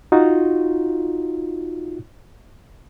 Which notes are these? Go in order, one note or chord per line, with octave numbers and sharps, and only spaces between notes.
D#4 F4 F#4